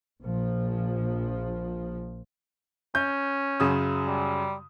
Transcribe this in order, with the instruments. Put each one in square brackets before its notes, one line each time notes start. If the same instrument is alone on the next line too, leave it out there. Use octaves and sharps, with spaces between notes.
[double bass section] A#1 F3
[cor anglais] C#4 [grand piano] G6
[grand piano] F#2 C#3 D#6
[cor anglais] G3